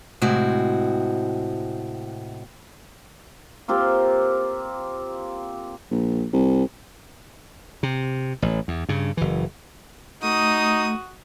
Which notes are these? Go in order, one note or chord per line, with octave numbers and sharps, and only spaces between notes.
A2 C3 G#3 C4 F#4
A#3 C4 F4 G4
A#1
C2
C3
A1
E2
G2 C#3
F#1 E3
A3 D#4 F#4 D#6